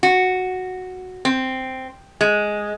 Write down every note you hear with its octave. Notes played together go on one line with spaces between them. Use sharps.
F#4
C4
G#3